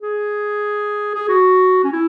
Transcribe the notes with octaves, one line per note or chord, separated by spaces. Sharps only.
G#4
G#4
F#4
C#4
E4